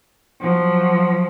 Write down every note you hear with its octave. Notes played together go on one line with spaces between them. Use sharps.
F3 F#3